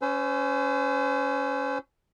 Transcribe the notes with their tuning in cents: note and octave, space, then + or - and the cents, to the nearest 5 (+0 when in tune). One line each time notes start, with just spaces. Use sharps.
C#4 +15 C5 -35 E6 +0